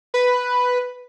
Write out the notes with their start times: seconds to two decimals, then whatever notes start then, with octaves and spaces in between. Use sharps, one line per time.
0.14 B4